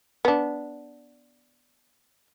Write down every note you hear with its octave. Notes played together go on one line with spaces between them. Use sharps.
B3 D4